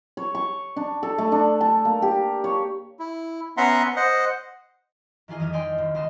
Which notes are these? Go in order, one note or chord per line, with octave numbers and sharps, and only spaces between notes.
C#5
C#6
D4
A4
A3
D4
A5
A#3
G4
C#5
E4
B3 C#4 E5 F#5 A#5 C6
C5 D#5 F#5
D#3 E3 F4 G#4 D#5
F2 G3 D#6 F6 G#6
D5 D#5 G5 G#5 C6
D#1
C#2 D#5 C6 E7